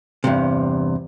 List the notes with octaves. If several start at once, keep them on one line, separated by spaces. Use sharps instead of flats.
E2 G2 C3